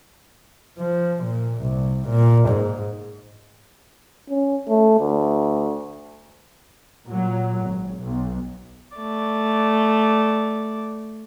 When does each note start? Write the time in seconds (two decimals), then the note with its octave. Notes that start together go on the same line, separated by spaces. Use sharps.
0.79 F3
1.24 A#2
1.62 C2
2.09 A#2
2.49 G#2
4.30 C#4
4.69 A3
5.00 D2
7.06 A#2 F#3
7.63 G#1
8.01 B1
8.97 A3 D5